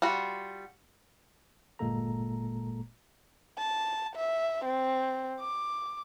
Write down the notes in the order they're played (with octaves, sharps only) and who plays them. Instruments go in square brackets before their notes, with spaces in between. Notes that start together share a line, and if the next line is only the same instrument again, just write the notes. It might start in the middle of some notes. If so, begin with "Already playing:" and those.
[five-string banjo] G3 F4 F#4
[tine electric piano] G1 A#2 G#3 A#3 A4 A#5
[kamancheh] A5
E5
C4
D6